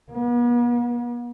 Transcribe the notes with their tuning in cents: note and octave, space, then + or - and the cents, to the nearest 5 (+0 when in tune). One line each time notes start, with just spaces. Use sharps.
B3 -45